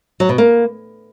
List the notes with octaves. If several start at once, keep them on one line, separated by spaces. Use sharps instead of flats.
F#3
B2
A#3